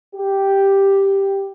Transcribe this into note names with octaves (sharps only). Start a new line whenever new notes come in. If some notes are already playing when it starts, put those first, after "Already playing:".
G4